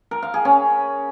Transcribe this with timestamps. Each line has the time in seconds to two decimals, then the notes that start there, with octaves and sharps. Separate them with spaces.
0.11 A#4
0.23 F5
0.34 G#4
0.45 C#4